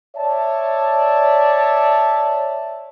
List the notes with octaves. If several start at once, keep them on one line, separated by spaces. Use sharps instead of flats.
C#5 D5 E5 A5